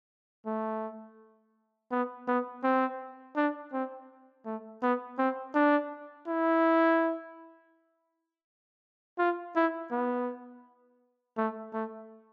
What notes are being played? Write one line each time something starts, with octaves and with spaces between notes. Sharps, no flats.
A3
B3
B3
C4
D4
C4
A3
B3
C4
D4
E4
F4
E4
B3
A3
A3